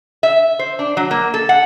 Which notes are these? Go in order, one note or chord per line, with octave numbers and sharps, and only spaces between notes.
E5
C5
D4
F#3
A#3
A4
F#5